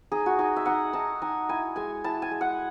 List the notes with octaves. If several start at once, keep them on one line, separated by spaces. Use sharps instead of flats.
D#4 G#4
F#4
D#4 G#4
E5
D#4 F#5
D#4 A5
D#4 G#5
E4 G#5
G#3 G#5
E4 A5
G#5
G#3
F#5